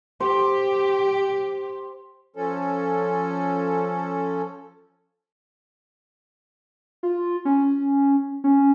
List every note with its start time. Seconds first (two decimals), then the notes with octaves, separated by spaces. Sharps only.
0.20 G4 C5
2.36 F3 C#4 A4
7.03 F4
7.45 C#4
8.44 C#4